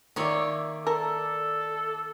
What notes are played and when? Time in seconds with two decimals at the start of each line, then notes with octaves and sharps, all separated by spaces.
0.16 D#3 A#3 C#5 D5 E5 D#6
0.87 A4 A#4 A5